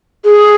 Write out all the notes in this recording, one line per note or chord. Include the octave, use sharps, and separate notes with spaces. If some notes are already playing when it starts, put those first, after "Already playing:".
G#4